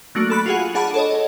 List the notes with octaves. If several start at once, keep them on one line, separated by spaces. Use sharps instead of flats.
F#3 A3 A#3 D4 F#4
A4 B5 F#6
F4 F#4 G#4 F#5
D4 G#4 F#5 A5 B5
A4 C#5 D#5